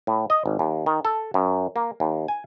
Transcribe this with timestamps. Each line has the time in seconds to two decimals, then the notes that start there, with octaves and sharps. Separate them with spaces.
0.07 A2
0.30 D#5
0.46 G#1
0.59 D#2
0.86 D#3
1.05 A4
1.34 F#2
1.76 A#3
2.00 D#2
2.28 G#5